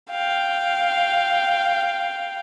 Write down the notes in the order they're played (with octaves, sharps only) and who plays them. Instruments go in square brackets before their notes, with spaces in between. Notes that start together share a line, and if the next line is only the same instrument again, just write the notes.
[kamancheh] F5 G5